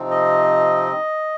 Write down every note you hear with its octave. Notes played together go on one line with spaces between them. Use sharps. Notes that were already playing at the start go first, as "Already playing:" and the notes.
Already playing: C3 F3 C4 D#4
D#5